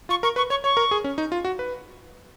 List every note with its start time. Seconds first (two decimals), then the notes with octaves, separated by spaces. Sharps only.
0.09 F4 C#6
0.23 A#4 C#6
0.36 B4 C#6
0.50 C#5 C#6
0.64 C#5 C#6
0.77 A#4
0.91 G#4
1.04 C#4
1.18 D#4
1.32 F4
1.45 F#4
1.59 B4